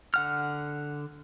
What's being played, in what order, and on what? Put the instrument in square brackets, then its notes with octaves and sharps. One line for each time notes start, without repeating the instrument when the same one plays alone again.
[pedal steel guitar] D3 F#5 F6